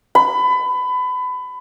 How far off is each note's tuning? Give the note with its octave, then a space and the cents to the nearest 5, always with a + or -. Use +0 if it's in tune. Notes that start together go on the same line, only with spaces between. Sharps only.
B5 +25